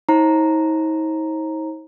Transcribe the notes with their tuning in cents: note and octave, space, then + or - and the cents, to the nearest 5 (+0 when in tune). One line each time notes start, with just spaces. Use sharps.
D#4 +45 C5 +45 A#5 -5